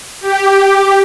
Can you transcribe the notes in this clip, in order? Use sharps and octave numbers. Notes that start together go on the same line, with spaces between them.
G4